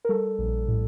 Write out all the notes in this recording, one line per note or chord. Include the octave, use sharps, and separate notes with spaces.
A#4
G3 A4
A#1
A2